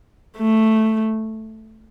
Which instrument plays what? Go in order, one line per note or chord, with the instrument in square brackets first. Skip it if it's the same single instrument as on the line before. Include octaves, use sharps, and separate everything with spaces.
[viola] A3